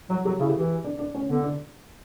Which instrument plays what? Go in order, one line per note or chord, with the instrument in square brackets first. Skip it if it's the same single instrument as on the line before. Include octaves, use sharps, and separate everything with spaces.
[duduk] F#3 [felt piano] F#4
[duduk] F#3 [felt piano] G4
[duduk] C#3 [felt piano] E4
[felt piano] G4
[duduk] E3
[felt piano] G4
D4
D4
C#4
[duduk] D3 [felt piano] B3
[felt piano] D4